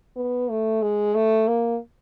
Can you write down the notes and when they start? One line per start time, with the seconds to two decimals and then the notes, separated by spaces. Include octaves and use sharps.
0.16 B3
0.49 A3
0.82 G#3
1.15 A3
1.48 A#3